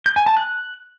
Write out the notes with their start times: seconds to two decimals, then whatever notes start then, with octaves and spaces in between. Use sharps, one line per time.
0.06 G6
0.16 G#5
0.26 A5
0.37 F#6